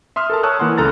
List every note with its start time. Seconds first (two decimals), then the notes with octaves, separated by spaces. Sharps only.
0.16 E5 C6 D#6 F6
0.30 A4 A#4 A5
0.43 C#5 A5 C#6 D#6 E6 F#6
0.59 E3 A#3 E4 F#5 C6
0.78 C#2 A4 A#5 F6 A6